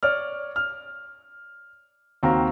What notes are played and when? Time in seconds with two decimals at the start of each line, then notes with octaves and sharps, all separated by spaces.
0.03 C#5 D5 F6
0.56 F6
2.23 D#2 C4 F#4 F5 A#5